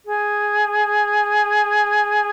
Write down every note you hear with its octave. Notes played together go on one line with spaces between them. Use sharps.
G#4